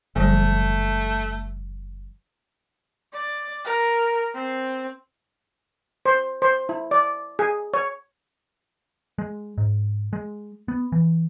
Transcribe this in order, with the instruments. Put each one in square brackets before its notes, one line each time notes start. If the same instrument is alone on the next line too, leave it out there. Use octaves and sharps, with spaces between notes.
[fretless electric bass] F#1 [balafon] D3 F3 G3 [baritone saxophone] A3
[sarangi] D5
A#4
C4
[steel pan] C5
C5
E4
D5
G#4
C#5
[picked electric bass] G#3
G#2
G#3
B3
E3